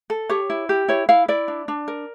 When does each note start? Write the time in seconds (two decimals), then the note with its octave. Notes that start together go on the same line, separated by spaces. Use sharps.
0.10 A4
0.30 G4 C#5
0.50 E4
0.69 G4
0.88 E4 C#5
1.09 E4 F5
1.28 E4 D5
1.48 D4
1.68 D4
1.88 A#4